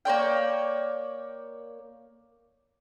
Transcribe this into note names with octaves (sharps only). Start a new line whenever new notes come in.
A#3 C#5 D5 G5